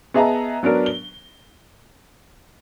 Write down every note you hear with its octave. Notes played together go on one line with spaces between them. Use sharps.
B3 G#4 D#5 E5 A5 A#5
F#3 B3 D4 A#4
G7